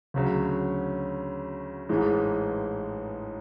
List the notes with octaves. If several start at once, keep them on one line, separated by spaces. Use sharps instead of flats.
D2 C#3 F#3
A1 G#2 E3 G#3